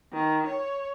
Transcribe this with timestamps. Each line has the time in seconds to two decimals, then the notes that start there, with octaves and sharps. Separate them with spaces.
0.13 D#3
0.46 C#5